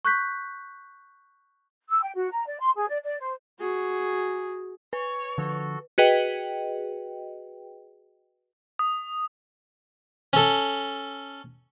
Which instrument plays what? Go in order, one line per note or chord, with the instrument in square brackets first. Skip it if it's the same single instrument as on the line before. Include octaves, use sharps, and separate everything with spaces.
[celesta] C#6 F#6 G6 B6
[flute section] E6
G5
F#4
A#5
D5
C6
G#4
D5
D5
C5
[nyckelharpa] F#4 G#4
[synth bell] B4 [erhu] C#5
[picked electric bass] D3 F3 [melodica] F#4 A4
[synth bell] F#4 G#4 B4 D#5 G5
[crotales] D#6
[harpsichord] C#4 A4